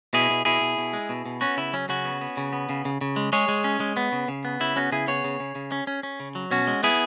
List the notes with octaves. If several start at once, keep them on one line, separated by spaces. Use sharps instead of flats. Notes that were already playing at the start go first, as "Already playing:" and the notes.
B2 E4 G#4
B2
B2 E4 G#4
B2
B2
G#3
B2
B2
B3 C#4 F#4
C#3 E4
F#3 C#4
C#3 C#4 F#4
B3
B3
C#3
B3
C#3
C#3
C#3
G#3
G#3 G#4 C#5
G#3
C#4
G#3
B3
C#3
C#3
B3
C#3 E4
B3 C#4 F#4
C#3 E4 G#4
B3 G#4 C#5
C#3
C#3
C#3
C#4
C#4
C#4
C#3
F#3
B2 C#4 F#4
G#3
B3 E4 G#4